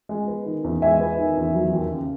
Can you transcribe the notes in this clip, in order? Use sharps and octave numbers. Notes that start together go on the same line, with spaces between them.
G#3
B3
D#3
E2
G#3 E5 G#5
B3
D#3
E2
F#3
D#2
C#3